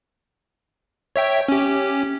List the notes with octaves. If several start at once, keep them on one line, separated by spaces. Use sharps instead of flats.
C#5 E5 G5
C#4 G4